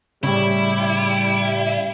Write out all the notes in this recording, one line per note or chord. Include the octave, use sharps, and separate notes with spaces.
A2 C#3 G3 E4